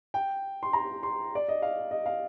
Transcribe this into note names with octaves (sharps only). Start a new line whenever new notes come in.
G5
C6
A#5
C6
D5
D#5
F5
D#5
F5